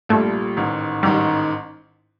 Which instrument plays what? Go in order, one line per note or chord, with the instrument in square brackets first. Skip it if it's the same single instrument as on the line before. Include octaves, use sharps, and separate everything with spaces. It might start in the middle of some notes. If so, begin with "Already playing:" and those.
[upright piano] A#1 A#2 G3 [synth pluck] A3
[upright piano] A1 G#2 D#3
[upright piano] A1 G#2 D#3 [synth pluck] G3